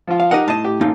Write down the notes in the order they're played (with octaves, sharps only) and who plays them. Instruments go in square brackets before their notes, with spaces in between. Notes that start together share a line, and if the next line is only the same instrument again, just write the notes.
[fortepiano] F3 F4
[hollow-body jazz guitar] F5
[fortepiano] D#4 G4 A#4 [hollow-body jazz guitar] D#5 F#5
[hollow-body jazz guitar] A2 D#5 [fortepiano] A5
[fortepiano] G4
[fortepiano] A1 [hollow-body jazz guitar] A#3 D#4 F4